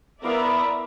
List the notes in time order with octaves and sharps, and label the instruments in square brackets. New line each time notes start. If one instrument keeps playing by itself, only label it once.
[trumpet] B3 [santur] E4 F5 D#6 [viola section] A#4 D5 E5